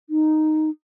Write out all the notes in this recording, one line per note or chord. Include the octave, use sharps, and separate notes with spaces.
D#4